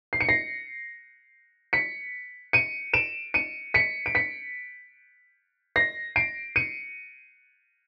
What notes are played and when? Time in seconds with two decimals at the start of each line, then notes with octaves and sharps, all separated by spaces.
0.13 C7
0.21 C#7
0.29 A#6 C7
1.73 B6 C#7
2.53 C#7 D#7
2.94 D7 E7
3.34 C#7 D#7
3.74 B6 C#7
4.06 D7
4.15 B6 C#7
5.76 A#6 C7
6.16 C7 D7
6.56 C#7 D#7